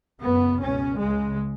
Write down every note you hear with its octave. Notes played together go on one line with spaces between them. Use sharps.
F#1 F#2 C#3 B3
C#2 B2 C#4
C#2 C#3 G#3